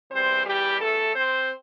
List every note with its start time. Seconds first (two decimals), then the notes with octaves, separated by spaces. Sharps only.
0.11 E2 E3 G3 C4 C5
0.46 G3 G4
0.81 A3 A4
1.16 C4 C5